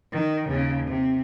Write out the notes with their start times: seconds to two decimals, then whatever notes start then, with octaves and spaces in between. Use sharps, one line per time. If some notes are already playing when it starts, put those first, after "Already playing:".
0.12 D#3
0.48 D#2 C#3
0.87 C3